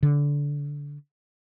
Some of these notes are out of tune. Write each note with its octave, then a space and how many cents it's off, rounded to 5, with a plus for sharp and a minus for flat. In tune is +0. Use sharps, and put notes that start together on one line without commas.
D3 -20